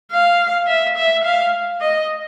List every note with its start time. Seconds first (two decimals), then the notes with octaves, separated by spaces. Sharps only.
0.11 F5
0.67 E5
0.96 E5
1.24 F5
1.81 D#5